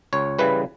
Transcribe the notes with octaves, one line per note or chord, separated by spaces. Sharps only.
C#2 C#5
C#3 E3 G3 B4